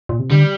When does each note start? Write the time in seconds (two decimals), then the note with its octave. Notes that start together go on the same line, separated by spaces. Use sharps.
0.09 A#2
0.19 C3
0.30 D3 G3